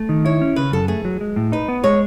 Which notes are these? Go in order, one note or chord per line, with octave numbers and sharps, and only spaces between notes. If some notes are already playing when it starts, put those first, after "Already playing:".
Already playing: A3
D#3
E4 C#5
C#4
C#3 B4
F#2 A4
A3 G#4
F#3
G#3
A2
D#4 B4
B3
G#3 C#5